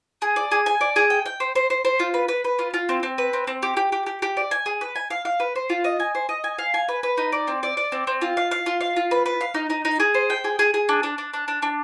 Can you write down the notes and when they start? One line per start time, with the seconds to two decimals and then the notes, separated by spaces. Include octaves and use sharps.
0.22 G#4
0.36 D5
0.52 G#4
0.66 G#5
0.81 D5
0.96 G#4
1.10 G5
1.26 G5
1.40 C5
1.55 C5
1.70 C5
1.85 C5
2.00 F4
2.14 B4
2.28 B4
2.44 B4
2.59 F4
2.74 F4
2.89 C4
3.03 C4
3.18 B4
3.33 C4
3.47 C4
3.63 G4
3.77 G4
3.92 G4
4.06 G4
4.22 G4
4.37 D5
4.51 G#5
4.66 G#4
4.81 B4
4.96 G#5
5.10 F5
5.25 F5
5.40 B4
5.56 C5
5.70 F4
5.84 D#5
6.00 G#5
6.15 C5
6.29 D#5
6.44 G#5
6.58 F5
6.74 G#5
6.88 B4
7.03 B4
7.18 D#4
7.32 D5
7.48 C4
7.63 D5
7.77 D5
7.92 C4
8.07 C4
8.22 F4
8.37 F5
8.51 F5
8.66 F4
8.81 F5
8.96 F4
9.11 B4
9.26 B4
9.41 F5
9.54 D#4
9.70 D#4
9.85 D#4
10.00 G#4
10.14 C5
10.30 G5
10.44 G#4
10.59 G#4
10.74 G#4
10.89 D4
11.03 D4
11.18 D4
11.34 D4
11.48 D4
11.62 D4